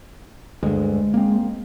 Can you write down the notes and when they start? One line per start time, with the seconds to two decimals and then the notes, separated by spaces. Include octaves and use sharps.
0.63 D2 G2 G#3
1.14 A#3 C4